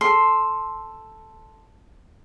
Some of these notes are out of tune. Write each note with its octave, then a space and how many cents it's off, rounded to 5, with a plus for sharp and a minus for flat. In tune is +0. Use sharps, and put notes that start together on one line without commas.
A4 +0 C6 +0